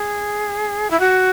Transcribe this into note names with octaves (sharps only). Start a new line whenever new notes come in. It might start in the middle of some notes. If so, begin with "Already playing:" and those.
Already playing: G#4
E4
F#4